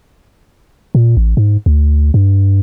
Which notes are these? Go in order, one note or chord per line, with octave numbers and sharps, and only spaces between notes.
A#2
A1
G#2
D2
G2